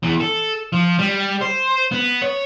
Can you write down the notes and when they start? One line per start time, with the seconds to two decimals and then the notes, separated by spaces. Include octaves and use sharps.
0.03 E2
0.20 A4
0.73 F3
0.99 G3
1.41 C5
1.91 B3
2.22 C#5